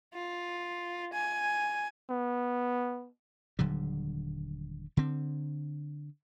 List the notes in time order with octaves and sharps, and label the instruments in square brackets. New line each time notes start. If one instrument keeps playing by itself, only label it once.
[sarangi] F4
G#5
[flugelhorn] B3
[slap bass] D#1 D3 F#3 G3
D3 C4